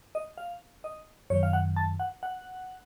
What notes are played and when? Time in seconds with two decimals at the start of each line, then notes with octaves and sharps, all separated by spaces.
0.15 D#5
0.38 F5
0.84 D#5
1.30 F#2 D#3 F#3 C#5
1.43 F5
1.53 F#5
1.76 A5
2.00 F#5
2.23 F#5